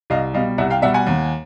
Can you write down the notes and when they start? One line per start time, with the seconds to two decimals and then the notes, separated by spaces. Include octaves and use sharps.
0.10 C2 D#5 F5
0.34 B2 G3 D#5 F5
0.58 C2 E5 F#5
0.70 F5 G5
0.82 B2 G3 E5 F#5
0.94 F#5 G#5
1.07 D#2